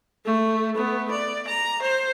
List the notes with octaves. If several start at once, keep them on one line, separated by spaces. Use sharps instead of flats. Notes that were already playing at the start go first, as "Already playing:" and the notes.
A3
A3 B3
D5
A#5
C5